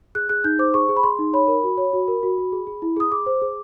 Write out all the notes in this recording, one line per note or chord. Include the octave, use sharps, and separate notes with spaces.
G#4 F#6
G#4 F#6
D#4 G6
C5 D6
G#4 C#6
G#4
B5
G#4 C6
D#4
C#5 B5
A#4
F#4
C#5
F#4
A#4
F#4
F#4
G#4
G#4
E4
G#4 D#6
G#4 D6
C5
G#4